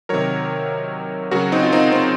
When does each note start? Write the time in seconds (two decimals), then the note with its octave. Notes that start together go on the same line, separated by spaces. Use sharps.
0.09 C3 D#3 F#3 A#4 C#5
1.31 C#3 F#3 F#4 A#4
1.52 C4 D#4
1.63 F4
1.73 C4 D#4
1.92 C4